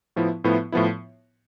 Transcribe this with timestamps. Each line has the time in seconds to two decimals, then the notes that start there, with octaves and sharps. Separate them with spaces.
0.16 A2 F3 B3 E4
0.44 A2 F3 B3 E4
0.72 A2 F3 B3 E4